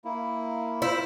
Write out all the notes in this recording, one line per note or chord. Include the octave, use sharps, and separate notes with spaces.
A#3 E4
E4 F4 C5